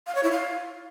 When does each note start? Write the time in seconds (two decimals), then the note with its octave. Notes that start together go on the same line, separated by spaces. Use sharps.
0.07 F5
0.15 C#5
0.23 E4
0.32 F5